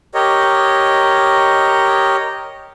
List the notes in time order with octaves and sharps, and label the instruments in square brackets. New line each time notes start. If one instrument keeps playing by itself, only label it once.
[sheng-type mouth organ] G4 A#4 C#5 D#5